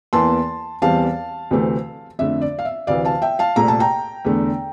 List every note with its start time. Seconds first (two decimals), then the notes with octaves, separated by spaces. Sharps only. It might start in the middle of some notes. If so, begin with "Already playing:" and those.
0.13 E2 E3 A#3 A5 C6
0.82 E2 E3 G3 C4 F5 A5
1.51 D2 C3 E3 A3 C4
2.19 F2 D3 A3 E5
2.42 D5
2.59 F5
2.65 E5
2.87 D2 C3 E3 D5 F5
3.05 F5 A5
3.22 E5 G5
3.39 F5 A5
3.56 C2 A#2 A3 C4 A#5
3.68 A5
3.80 G5 A#5
4.25 E2 D3 A3